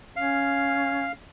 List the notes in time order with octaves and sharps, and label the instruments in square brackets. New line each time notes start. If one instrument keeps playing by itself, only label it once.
[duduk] C#4 [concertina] F5